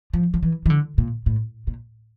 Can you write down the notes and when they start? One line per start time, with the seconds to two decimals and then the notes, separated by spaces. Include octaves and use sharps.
0.13 F3
0.34 F3
0.43 E3
0.66 E3
0.70 D3
0.98 A#2
1.26 A2
1.67 A#2